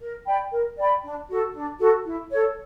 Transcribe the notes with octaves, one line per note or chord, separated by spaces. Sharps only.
A#4
D5 G5 B5
A#4
D5 G5 B5
D4
F#4 A4
D4
F#4 A4
E4
A4 C#5